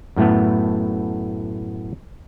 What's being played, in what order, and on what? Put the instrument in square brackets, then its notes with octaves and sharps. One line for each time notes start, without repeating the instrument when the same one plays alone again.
[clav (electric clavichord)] F#2 A2 A3 B3